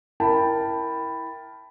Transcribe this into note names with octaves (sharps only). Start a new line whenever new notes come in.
E4 A#4 G5 A5 B5